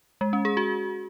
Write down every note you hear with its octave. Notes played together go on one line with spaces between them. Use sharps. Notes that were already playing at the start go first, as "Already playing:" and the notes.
G#3
C#4
G#4
F#4